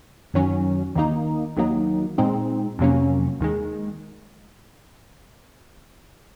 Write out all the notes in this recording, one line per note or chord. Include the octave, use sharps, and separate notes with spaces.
F#2 D#3 F#3 C#4
D#2 D#3 A#3 D#4
D#2 D#3 F#3 A#3 D#4
A#2 G#3 C4 D#4
F2 C3 F#3 A#3 C#4
D#2 D#3 G#3